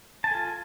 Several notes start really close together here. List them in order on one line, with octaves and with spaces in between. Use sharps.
A5 G#5 A4 F4